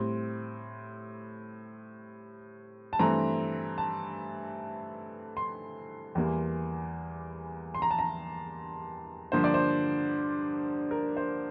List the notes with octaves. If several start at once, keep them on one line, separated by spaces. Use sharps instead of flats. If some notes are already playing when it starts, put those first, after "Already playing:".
Already playing: A2 G3 C4
A5
G2 E3 A3 C4 A#5
A5
C6
E2 E3 G3 A#3
C6
A#5
A5
A#5
G2 D3 F3 A#3 C5
D5
C5
A#4
C5